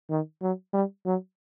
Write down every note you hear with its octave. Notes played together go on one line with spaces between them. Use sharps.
D#3
F#3
G3
F#3